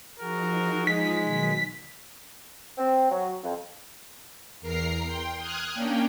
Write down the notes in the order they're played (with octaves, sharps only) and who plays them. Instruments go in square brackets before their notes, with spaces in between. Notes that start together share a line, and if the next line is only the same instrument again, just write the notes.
[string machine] F3 D#4 [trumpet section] F#4 G#4 A#4
[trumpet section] G#3 [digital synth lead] B6
[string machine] B2 D#3 F#3
[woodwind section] C4
F#3
F2
[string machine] E2 A#4 A#5 C7
G5 C6
D#6 F6 F#6 G#6
A#3 C#4 D4 G5